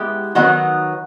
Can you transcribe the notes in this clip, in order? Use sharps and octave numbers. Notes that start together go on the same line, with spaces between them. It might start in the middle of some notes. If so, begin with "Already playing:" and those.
Already playing: G#3 B3 E4 G4
D#3 F#3 B3 D#4 F#4